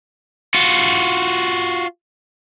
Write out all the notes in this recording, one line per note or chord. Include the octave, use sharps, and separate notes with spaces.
F4 F#4